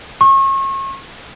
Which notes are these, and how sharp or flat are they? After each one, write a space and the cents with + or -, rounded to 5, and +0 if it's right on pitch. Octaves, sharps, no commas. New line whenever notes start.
C#6 -35